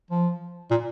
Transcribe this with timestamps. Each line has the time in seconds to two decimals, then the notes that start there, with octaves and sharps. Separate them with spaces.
0.10 F3
0.71 A#2